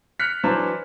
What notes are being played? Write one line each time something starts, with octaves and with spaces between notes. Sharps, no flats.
F6 F#6 B6 C#7
E3 F#3 D4 C5